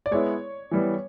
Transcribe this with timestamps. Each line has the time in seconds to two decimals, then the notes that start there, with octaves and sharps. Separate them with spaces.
0.06 D5
0.11 G#3 B3 E4 C#5
0.71 E3 G3 B3